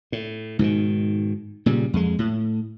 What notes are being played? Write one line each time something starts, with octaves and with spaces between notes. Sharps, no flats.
A2
G#2 B2 D3 D#3
A#2 C#3 G3
F2 G#3
A2